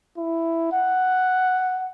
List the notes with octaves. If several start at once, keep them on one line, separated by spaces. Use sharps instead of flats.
E4
F#5